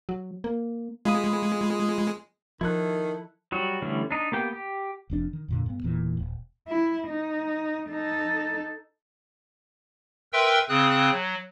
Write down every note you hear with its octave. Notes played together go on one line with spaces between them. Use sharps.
F#3
A#3
G#3 F4 B5 D#6
D#3 F3 E4 A4 F#6
F#3 G3 F#4
D3 E3 G3 A3 C#4
D4 D#4
A#3 B3 G4 G5
G4
F1 F2 D4
D#3
F2 A#2 D3
G2 B3
E1 E2 A#2 E3
D#1
E4
D#4
D#4 A4
A#4 B4 E5 G5 C6 E6
C#3 C4 D#6 F#6
F#3